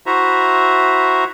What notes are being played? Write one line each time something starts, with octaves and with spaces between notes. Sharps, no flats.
E4 F#4 C5 E5 A#5